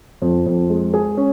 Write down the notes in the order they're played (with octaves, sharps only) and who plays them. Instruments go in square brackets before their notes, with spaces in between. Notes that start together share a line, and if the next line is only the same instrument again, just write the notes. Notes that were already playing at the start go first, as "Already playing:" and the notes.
[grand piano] F2
F2
G#3
G#4
C#4